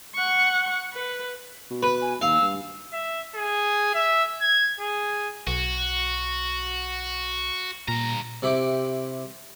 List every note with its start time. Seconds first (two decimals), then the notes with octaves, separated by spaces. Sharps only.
0.15 F#5 C#6
0.94 B4
1.70 B2
1.83 B4
2.02 G#5
2.22 D#2 F5 E6
2.41 G2
2.93 E5
3.35 G#4
3.94 E5
4.41 G#6
4.80 G#4
5.47 B1 F#4
7.88 G2 A#2 A#5
8.42 C3 E4 G4 D6